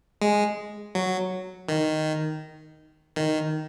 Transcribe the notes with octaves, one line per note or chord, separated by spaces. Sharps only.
G#3
F#3
D#3
D#3